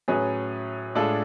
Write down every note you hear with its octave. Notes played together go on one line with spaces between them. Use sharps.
A2 F#3 C#4 G#4 B4
A2 G#3 D4 F4 A4